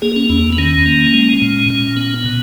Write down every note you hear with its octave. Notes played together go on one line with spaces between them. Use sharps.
A#3 G#4
C#4
E2 C#4
B3
D#3 C#4
A#3
G#3
A#2
A#2
B3
B2